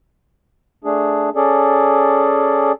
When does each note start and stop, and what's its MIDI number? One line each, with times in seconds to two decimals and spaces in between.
0.84 1.30 57
0.84 1.30 62
0.84 1.30 68
1.36 2.72 61
1.36 2.72 68
1.36 2.72 69
1.36 2.72 74